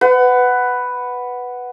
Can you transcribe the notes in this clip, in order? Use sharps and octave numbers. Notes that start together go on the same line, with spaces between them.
B4 F#5